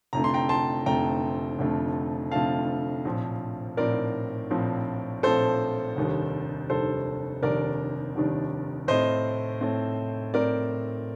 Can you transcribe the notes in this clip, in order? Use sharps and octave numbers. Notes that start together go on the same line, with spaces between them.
F1 F2 D3 A3 A#5
C6
G5 A#5
A5 C6
F1 F2 D3 A3 G5 A#5
F1 F2 D3 A3
F1 F2 D3 A3 F5 A5
A#1 A2 F3 C4
A#1 A2 F3 C4 A#4 D5
A#1 A2 F3 C4
A#1 A2 F3 C4 A4 C5
F1 D#2 D#3 G3 D4
F1 D#2 D#3 G3 D4 A4 C5
F1 D#2 D#3 G3 D4 A#4 D5
F1 D#2 D#3 G3 D4
A2 A3 C4 C5 D#5
A2 A3 C4
A2 A3 C4 A#4 D5